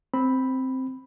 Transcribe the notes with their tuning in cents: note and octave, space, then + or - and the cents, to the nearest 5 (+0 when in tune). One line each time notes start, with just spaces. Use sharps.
C4 +0 B5 +0